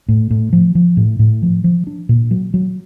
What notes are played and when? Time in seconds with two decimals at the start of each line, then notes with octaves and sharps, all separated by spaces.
0.08 A2
0.31 A2
0.53 F3
0.75 F3
0.97 A2
1.19 A2
1.42 F3
1.64 F3
1.87 D4
2.09 A#2
2.31 F#3
2.54 F#3